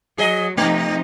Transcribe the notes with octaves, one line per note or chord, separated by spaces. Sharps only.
F#3 G#4 D#5
C3 F3 A3 D#4